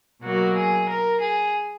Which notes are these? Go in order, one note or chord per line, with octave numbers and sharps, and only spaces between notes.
B2 F#3 A#3 F#4
G#4
A#4
G#4